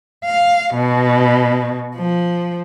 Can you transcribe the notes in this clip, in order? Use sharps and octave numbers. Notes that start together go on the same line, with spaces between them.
F5
B2
F3